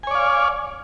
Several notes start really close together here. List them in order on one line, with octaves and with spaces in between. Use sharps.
G#5 C#5 D5 F5